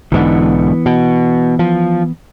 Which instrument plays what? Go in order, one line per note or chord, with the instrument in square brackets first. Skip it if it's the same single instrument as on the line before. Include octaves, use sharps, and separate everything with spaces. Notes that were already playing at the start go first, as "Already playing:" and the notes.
[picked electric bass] B1 G#2 D3 [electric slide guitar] E3 B3
[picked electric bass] B2
F3